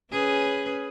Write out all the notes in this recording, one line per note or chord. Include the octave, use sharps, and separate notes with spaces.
C#4 G#4 B4